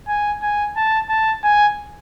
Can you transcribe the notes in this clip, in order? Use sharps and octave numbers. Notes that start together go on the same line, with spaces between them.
G#5
G#5
A5
A5
G#5